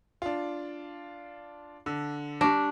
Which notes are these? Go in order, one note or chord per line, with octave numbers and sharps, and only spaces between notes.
D4 F4
D3
G3 D4 C#6 A#6